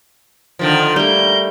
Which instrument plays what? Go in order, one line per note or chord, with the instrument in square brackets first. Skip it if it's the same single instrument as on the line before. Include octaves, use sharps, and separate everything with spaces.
[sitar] D3 D#3 F3
[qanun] G3 A3 [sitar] A#3 [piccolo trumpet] G6